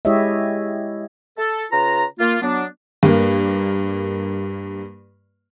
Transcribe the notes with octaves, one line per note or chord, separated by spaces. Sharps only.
G#3 E4 G4 C#5 D#5 E5
A4
C#3 F4 B4 A#5
A#3 F4
F#3 B3 D4
G2 A#3